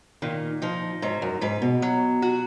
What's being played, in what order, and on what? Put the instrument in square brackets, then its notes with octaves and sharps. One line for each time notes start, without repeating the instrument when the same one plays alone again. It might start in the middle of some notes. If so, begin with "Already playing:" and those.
[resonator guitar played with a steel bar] A#2 [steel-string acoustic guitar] D#3
[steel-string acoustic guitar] F3 [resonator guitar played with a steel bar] D#4
[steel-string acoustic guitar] G#2 [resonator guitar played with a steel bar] F#3
[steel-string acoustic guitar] F#2
[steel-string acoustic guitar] G#2 [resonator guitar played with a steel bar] B4
[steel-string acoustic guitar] B2
[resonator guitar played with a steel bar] F#3
F#4